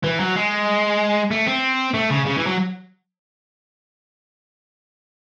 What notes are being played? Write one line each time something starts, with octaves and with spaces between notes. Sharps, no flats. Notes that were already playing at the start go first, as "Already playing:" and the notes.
E3
F#3
G#3
A3
C4
A3
C#3
C#3
E3
F#3